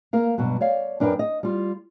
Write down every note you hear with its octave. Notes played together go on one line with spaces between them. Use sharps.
A#3 A#4 F5
G2 B2 F#3
C#5 D5 F5
F#2 D4 A#4 B4 G5
D#5
G3 F4